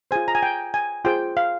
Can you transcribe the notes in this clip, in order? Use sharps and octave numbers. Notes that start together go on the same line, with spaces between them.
F4 G#4 C5 G#5
A#5
G#5
G5
G#5
F4 G#4 C5 G5
F5